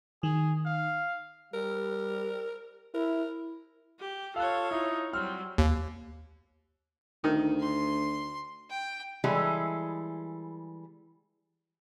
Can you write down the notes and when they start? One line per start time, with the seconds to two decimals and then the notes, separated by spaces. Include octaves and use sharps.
0.23 D#3 G#4
0.65 F5
1.54 G3 A#4
2.94 E4 A#4
3.99 G4
4.36 F4 A4 C#5 F5 F#6
4.71 D#4 E4
5.13 F#3 G3 C4 F6
5.58 D#2
7.24 D2 D#3
7.60 C6
8.70 G5
9.24 E3 G3 G#3 E4 G#4 A4